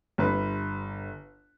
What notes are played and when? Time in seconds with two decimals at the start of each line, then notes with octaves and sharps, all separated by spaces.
0.18 G1 B4